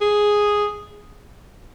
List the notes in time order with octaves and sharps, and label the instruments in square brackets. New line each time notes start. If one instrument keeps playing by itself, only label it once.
[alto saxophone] G#4